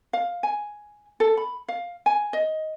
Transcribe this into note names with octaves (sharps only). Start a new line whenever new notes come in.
F5
G#5
A4
B5
F5
G#5
D#5